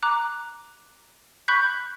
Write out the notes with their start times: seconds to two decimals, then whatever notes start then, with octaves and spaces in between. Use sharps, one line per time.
0.03 A#5 D6 F#6
1.48 B5 C#6 F#6 G6 B6